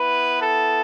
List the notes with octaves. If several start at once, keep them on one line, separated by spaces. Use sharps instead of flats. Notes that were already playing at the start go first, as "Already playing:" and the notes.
Already playing: B3 E4 B4
A4